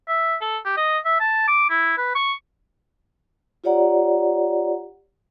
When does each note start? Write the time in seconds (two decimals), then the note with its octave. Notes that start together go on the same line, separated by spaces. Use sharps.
0.08 E5
0.41 A4
0.65 G4
0.77 D#5
1.05 E5
1.20 A5
1.48 D6
1.70 E4
1.97 B4
2.15 C#6
3.64 F4 G4 C#5 D5 F#5 A#5